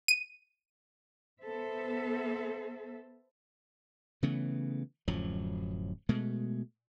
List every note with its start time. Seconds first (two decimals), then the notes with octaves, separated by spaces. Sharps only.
0.08 D#7
1.42 B3 A4 C5 E5
4.23 C#3 E3 A3 B3
5.08 D1 F#2 F3 F#3
6.09 B2 G#3 A3